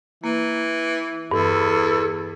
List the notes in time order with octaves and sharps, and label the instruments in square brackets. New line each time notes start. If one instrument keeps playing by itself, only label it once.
[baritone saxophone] E3 [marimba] A#3
[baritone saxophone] E2 [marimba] G2 E3 [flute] A4